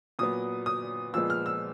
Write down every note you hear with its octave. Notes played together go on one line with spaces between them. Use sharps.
A#2 F#3 B3 D#6
D#6
A#2 F3 G#3 B3 E6
F6
E6